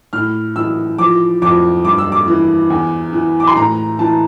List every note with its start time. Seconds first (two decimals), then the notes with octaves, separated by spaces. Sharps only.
0.13 A2 F6
0.56 E3 E6
0.98 F3 D6
1.42 F2 D6
1.84 G2 D6
1.98 E6
2.12 D6
2.28 E3
2.70 E2
3.13 E3
3.40 D6
3.47 C6
3.56 A2 A#5
3.99 E3 A5